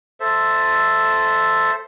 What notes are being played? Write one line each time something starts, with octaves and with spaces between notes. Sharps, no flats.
A4 C5 E5